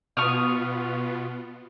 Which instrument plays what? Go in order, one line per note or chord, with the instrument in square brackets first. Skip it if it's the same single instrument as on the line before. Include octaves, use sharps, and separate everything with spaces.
[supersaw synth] B2 B3 F4 [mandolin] C#6 D#6 F6